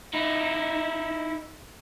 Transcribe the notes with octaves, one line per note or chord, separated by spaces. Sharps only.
D#4 E4